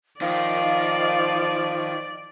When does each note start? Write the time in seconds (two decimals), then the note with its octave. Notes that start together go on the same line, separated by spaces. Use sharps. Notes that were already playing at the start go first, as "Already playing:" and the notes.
0.21 D#3 F3 D5 F5